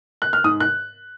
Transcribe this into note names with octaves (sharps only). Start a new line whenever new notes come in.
F#6
F6
G#2 D#6
F#6